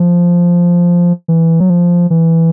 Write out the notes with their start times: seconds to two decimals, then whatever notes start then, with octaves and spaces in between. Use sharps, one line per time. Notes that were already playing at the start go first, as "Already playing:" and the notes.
Already playing: F3
1.28 E3
1.60 F#3
1.70 F3
2.10 E3